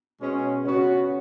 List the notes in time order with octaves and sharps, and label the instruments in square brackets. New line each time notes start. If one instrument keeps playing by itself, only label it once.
[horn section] B2 G#3 C#4
[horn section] C#3 B3 F#4 [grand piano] C#4